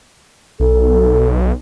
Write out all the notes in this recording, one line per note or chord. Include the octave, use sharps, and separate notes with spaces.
B1 A4